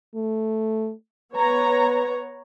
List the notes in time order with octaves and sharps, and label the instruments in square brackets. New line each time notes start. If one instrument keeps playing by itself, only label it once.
[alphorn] A3
[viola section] B3 C#5 A#5 [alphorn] B4